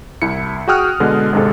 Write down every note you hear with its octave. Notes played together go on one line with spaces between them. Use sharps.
C2 E4 C#7
F#4 G#4 G5 D#6 F6 F#6
B2 D3 G#3
G#1 C3 G#3 D4 A4